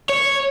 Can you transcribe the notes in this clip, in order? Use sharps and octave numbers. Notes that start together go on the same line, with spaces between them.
C#5